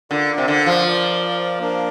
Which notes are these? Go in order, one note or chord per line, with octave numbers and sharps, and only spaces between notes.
D3 F4 A#4 D5
C3
D3
F3
F4 A#4 D5
A#3 D4 A#4